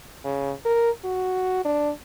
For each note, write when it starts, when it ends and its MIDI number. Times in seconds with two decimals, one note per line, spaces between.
0.24 0.52 49
0.65 0.90 70
1.04 1.63 66
1.65 1.91 62